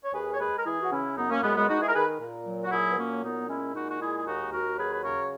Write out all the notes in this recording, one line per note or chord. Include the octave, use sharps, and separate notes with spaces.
C#5
D#2 G#4 B4
C#5
G#3 G#4 B4
A#4
E3 E4 G#4
F#4
C#3 C#4 E4
F#2 B3 D#4
A#3 C#4
F#2 G#3 B3
G#3 B3
G#3 D#4 F#4
E4 G#4
A#4
D#3 G#4 B4
A#2
F#3
F#4
A#2 E4 G#4
B3
F#3 A#3 C#4
A#2 B3 D#4
G#3 C#4 E4
A#2 D#4 F#4
F#4
G#3 E4 G#4
G#4
D#2 D#4 F#4
D#2 F#4 A#4
F#3 G#4 B4
B4
C#3 A#4 C#5